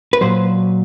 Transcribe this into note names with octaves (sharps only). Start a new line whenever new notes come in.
B4
A#2 F#3 C5